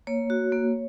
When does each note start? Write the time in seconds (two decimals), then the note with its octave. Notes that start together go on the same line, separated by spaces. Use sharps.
0.07 A#3 C#5
0.30 F#4
0.52 A#3